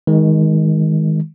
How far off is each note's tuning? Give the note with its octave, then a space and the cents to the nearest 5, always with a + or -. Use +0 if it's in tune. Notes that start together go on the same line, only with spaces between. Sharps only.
D#3 +25 G#3 +0